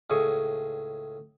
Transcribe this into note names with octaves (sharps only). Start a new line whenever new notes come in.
C#2 A2 G#4 C#6